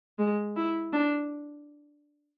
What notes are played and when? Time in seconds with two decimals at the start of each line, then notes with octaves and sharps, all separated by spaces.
0.18 G#3
0.56 E4
0.93 D4